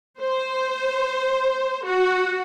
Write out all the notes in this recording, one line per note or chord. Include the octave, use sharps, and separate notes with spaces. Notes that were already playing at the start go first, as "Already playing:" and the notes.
C5
F#4